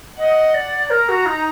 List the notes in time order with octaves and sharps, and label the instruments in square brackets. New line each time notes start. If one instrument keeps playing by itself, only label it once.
[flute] D#5 [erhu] F#5
[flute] D5
[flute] A#4 [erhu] A#5
[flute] F#4
D#4